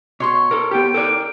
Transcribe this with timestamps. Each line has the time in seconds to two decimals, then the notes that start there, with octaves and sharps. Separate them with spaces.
0.20 B2 C#5 C6 C#6
0.51 A4 A#4
0.71 B3 G4 G5
0.94 A4 A#4 D5